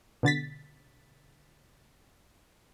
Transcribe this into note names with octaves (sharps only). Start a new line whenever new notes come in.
B2 D3 A6 B6